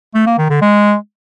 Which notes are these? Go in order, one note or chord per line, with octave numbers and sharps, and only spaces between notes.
A3
A#3
D#3
D3
G#3